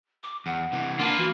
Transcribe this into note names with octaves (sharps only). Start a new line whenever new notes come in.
D6
E2 F#5
C3 E3
A#3 D4 F4 B4 A5
E3 F#4